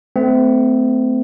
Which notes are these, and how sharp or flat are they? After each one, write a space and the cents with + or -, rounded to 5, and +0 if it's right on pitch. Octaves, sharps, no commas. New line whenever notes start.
A3 +5 C4 -35